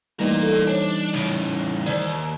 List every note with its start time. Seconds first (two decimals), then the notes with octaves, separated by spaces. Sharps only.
0.19 E3 G3 A3 A#3 D#4 A#4 B4 D5
0.41 A4
0.67 D4 C5 C#5
1.13 A2 C#3
1.86 D#2 C5 D5